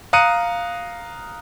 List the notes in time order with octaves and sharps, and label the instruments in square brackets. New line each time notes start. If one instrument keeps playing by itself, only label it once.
[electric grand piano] F5 A#5 D#6 F#6 C#7 D#7